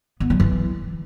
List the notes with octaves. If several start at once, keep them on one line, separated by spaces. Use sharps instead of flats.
B3
F#3
E3